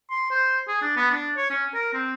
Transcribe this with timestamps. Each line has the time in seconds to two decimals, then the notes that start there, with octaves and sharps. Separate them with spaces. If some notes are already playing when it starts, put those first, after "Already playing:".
0.10 C6
0.31 C5
0.68 G#4
0.82 D4
0.97 B3
1.11 D4
1.37 C#5
1.50 C#4
1.74 A#4
1.94 C4